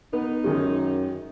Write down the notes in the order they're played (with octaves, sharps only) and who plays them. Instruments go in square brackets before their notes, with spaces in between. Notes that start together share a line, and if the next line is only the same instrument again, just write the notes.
[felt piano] B3 [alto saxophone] D#4
[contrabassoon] F#2 [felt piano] D#3 G#3